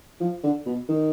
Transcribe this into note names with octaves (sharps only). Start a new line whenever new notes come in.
F3
D3
B2
D#3